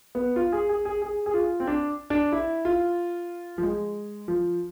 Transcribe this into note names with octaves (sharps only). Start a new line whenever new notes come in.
B3
F4
G#4
G#4
G#4
G#4
G#4
F4
C4
D4
D4
E4
F4
F3
G#3
F3